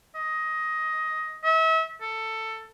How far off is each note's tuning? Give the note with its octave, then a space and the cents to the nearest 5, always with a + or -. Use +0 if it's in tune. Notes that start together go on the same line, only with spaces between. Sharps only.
D#5 +15
E5 -35
A4 +15